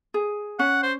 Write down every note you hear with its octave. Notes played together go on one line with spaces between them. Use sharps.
G#4
C#4 F#5
C5